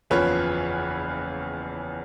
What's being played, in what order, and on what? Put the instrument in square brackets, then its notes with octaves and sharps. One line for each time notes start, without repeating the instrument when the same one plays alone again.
[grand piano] F#1 E2 C#3 F3 B4 C#5